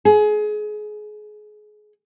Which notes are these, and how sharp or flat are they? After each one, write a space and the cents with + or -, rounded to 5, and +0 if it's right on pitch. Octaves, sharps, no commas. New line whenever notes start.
G#4 +25